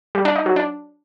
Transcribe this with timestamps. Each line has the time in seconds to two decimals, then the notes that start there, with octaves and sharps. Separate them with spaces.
0.15 G3
0.25 D4
0.36 D#4
0.46 F#3
0.56 D4